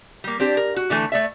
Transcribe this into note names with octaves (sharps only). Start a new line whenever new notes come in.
G3 A#3
C4 D4 G4
A#4
F#4
D3 E3 A3
A3 D5 E5